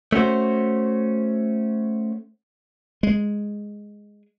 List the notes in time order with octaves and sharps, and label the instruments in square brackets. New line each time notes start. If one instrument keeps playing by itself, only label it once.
[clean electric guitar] A3 C#4 F#4 C5
[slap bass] G#3